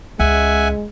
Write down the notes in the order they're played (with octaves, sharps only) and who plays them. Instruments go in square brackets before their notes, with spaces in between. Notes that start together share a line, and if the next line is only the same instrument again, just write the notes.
[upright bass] C#2 [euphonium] G#3 [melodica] E5 F#5 G#5